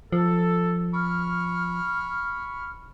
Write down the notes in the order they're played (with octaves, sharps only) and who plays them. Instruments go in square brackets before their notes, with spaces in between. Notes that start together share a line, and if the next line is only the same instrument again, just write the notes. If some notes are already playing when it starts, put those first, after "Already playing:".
[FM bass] F3 [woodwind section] A4
[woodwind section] B5 C#6 F6